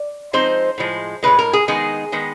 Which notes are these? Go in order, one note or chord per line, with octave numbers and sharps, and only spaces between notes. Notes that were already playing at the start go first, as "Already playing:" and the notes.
Already playing: D5
F3 G#3 C4 D#4 C5
A2 F3 G#3
A2 F3 G#3 B4
A#4
G#4
D#3 G#3 B3 D#4 G#4
D#3 G#3 B3 D#4